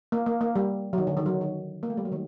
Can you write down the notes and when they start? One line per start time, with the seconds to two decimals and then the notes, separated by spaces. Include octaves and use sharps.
0.12 A#3
0.26 A#3
0.41 A#3
0.56 G3
0.93 F#3
0.98 D#3
1.07 D3
1.17 D#3
1.26 F#3
1.41 D#3
1.83 A#3
1.90 A3
1.97 G3
2.05 F#3
2.12 D#3